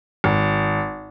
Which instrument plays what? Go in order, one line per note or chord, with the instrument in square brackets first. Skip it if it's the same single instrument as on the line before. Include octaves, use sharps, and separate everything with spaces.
[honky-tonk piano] G#1